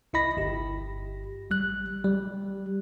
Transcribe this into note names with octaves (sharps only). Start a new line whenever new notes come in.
C2 E4 D#5 B5 A#6
G1 G4
A1 G3 F#6
G3